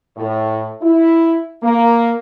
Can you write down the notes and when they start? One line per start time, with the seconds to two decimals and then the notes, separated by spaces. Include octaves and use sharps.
0.17 A2
0.82 E4
1.63 A#3